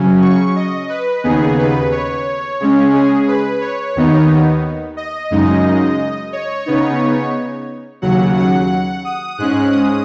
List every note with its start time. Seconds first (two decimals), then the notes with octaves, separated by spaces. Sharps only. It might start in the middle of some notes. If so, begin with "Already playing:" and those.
Already playing: C#3 F#3 C#4
0.22 C#6
0.56 D#5
0.89 B4
1.24 D#2 C#3 B3 D#4 G#4
1.58 B4
1.92 C#5
2.60 C#3 G#3 C#4
2.93 G#4
3.28 B4
3.61 C#5
3.96 D#2 D#3 B3 D#4
4.97 D#5
5.31 F#2 C#3 G#3 D#4
6.33 C#5
6.66 C#3 B3 D#4
8.02 D#2 C#3 F#3 F#5
8.37 F#5
9.05 D#6
9.38 G#2 G#3 C#4 F#6
9.72 D#6